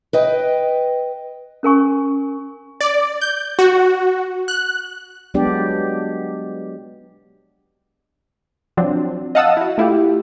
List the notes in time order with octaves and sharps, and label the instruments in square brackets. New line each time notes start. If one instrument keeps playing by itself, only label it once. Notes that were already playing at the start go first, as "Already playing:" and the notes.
[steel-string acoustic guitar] B4 D#5 G5
[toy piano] C#4 A#4 G#5 C#6
[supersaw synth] D5
G6
F#4
F#6
[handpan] F#3 G#3 B3 D4 G4 D5
[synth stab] F3 F#3 C4 D4
D#5 F5 F#5 A5 D#6 E6
E4 F#4
A3 E4 F4 G4